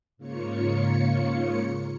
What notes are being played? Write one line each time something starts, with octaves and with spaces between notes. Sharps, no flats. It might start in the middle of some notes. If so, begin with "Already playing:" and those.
G#2 C#3 A#3 F4 C#5 C#7